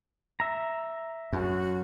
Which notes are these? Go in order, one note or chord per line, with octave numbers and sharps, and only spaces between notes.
E5 A#5
F#2 F#4